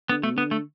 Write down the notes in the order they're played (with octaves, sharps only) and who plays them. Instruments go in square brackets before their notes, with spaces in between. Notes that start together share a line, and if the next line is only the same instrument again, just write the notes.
[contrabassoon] D3 [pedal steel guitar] B3
[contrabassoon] B2 [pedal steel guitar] A3
[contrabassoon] D3 [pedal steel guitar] B3
[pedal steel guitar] A3